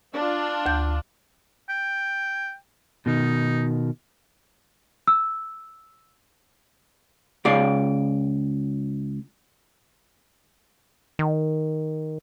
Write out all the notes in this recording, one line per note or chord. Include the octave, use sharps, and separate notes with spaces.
D4 F4
D2 G6
G5
B2 D#3 D#4
E6
C#2 G#4 D5 F5
D#3